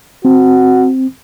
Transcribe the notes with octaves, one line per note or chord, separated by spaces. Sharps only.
C4 F#4